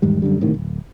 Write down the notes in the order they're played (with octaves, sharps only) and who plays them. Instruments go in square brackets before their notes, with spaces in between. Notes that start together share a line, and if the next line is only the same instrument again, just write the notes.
[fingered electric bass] E2 G#2 D#3 G3
F#2 D3 G3
G1 A2 C3 D#3
D1